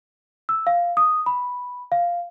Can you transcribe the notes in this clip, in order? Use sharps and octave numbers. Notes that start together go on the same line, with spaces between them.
E6
F5
D#6
B5
F5